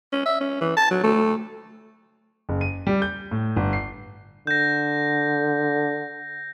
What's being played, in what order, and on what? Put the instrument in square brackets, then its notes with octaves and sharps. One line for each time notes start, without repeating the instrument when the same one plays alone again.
[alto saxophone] C#4
E5
C#4
E3
A5
F#3
A3
[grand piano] F#1
D#7
G3
G6
A2
G1
C7
[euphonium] D3 [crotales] G6 A#6